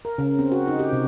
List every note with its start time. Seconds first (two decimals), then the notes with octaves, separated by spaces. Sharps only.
0.05 A#4
0.18 C#3
0.39 C4
0.52 F#4
0.68 D#4
0.79 G4
0.93 C3